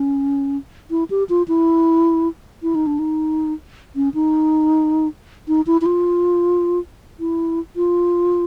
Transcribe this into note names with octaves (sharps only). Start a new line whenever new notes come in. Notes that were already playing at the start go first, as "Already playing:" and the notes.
Already playing: C#4
E4
G4
F4
E4
E4
D#4
D4
D#4
C#4
D#4
D#4
E4
E4
F4
E4
F4